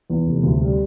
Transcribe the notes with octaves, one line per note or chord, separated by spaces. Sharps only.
E2
F1
D2
G3